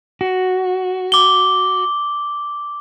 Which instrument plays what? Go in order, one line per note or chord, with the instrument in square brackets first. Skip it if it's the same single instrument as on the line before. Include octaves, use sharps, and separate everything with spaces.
[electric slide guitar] F#4
[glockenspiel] D6 G7